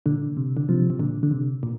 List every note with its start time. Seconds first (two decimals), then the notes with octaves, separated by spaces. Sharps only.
0.06 A#2 D3
0.37 C3
0.57 D3
0.69 C3 F3
0.90 C3
0.99 A#2 D3
1.23 D3
1.31 C3
1.63 A#2